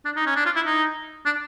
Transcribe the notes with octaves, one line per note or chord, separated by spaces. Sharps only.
D4
D#4
C#4
D4
F4
E4
D#4
D4